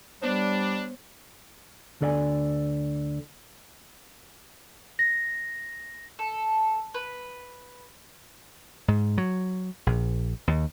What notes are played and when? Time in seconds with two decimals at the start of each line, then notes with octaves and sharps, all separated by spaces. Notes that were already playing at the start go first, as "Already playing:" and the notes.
0.21 G3 B3 D4 C5 C#5
2.01 D2 D3 A4 D5 F5 G#5
4.99 A#6
6.19 A4
6.94 B4
8.88 G#2
9.18 F#3
9.87 A#1
10.48 D#2